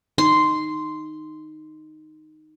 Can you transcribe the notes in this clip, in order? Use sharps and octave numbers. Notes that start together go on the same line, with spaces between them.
D#4 C6